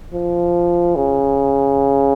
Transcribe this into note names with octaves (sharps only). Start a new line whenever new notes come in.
F3
C#3